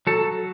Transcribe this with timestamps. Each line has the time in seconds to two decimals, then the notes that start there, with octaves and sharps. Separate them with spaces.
0.07 F#3 A4